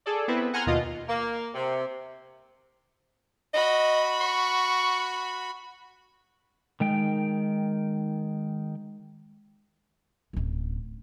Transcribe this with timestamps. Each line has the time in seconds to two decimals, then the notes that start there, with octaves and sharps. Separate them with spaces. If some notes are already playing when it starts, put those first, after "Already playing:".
0.06 G#4 A4 D5
0.28 B3 C4 E4 B4
0.54 F#5 G#5 A#5 C6 F6
0.66 D#2 B2 F4 D#5
1.08 A#3
1.54 C3
3.54 F#4 D#5 B5
4.21 C#6
6.80 D#3 G#3 G5
10.33 D1 C#4